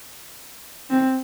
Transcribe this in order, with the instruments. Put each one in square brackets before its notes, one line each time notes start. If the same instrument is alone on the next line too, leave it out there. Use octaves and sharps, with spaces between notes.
[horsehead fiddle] C4